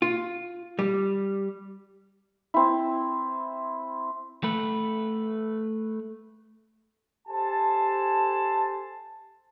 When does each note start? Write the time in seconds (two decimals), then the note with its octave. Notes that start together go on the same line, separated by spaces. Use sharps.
0.02 F4
0.79 G3
2.54 C4 E4
4.44 A3 B4
7.28 G4 A4 C5 G#5 A5